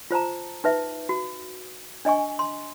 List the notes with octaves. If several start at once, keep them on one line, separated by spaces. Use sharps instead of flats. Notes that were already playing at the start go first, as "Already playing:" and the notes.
F4 C5 A5 A#5
D#4 B4 E5
F#4
D4 D#5 G#5 C#6
C6